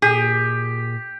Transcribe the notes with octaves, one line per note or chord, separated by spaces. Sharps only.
A#2 G4 G#4